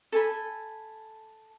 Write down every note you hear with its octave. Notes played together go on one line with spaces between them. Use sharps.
A4 G#5 B5